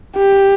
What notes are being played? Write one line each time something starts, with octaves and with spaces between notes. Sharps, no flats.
G4